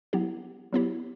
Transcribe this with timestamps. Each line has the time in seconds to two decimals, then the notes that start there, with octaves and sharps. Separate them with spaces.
0.13 F#3 B3 E4 G4
0.73 F#3 B3 E4 G4